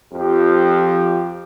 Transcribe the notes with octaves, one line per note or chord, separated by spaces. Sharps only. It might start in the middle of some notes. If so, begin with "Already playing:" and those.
F2 F3 G4